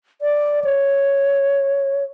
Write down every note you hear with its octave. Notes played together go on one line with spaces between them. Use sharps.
D5
C#5